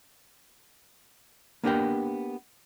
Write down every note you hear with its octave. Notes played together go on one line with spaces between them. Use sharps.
A#3 B3 D4 G4 A#4 G5